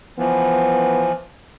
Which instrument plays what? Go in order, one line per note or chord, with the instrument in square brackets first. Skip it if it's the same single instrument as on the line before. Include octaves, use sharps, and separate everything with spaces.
[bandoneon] E3 F3 [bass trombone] B3